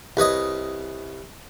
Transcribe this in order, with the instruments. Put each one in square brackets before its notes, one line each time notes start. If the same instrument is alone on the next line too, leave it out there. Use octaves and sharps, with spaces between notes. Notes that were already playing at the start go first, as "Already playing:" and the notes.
[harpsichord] C2 B4 C#5 D#5